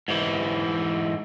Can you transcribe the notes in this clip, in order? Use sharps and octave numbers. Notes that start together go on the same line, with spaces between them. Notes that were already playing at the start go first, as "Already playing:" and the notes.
G#2 E3